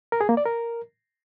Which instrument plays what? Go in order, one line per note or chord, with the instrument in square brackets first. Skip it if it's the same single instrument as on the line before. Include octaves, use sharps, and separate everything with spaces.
[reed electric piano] A#4
G#4
A#3
D5
A#4